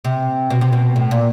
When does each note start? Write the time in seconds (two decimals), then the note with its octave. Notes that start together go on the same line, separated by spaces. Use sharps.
0.05 C3
0.50 B2
0.61 C3
0.72 B2
0.96 A2
1.11 A#2